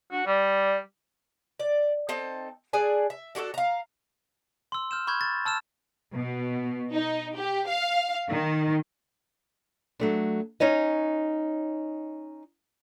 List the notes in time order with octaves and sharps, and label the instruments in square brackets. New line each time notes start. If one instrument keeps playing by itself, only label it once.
[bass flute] D4 [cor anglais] F#4
[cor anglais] G3 [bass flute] D5
[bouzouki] D5
C4 D#4 A4
D4 G#4 D5 G#5
E5
D4 F#4 G4 A4
F5 A#5
[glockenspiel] C6 E6
F6 G6 E7
B5 C#6 F6 G6 G#6
A6
A5 E6 F6 E7
[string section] B2
D#4
G4
F5
D#3
[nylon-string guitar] F#3 A3 D4
C#4 D#4 C#5 D#5